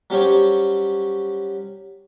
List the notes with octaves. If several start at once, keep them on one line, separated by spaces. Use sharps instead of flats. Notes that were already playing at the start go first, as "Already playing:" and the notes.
F#3 G3 C#4 G4 C5 C#5